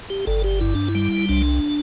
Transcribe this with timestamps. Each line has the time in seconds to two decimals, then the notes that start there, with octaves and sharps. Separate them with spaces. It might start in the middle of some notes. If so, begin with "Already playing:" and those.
0.10 G4
0.27 G1 A4
0.44 G4
0.61 G2 E4
0.75 D4
0.88 E4
0.95 G3
1.29 C2 D4